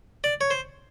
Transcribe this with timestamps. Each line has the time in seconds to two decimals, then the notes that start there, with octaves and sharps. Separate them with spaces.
0.24 D5
0.41 C#5
0.51 C5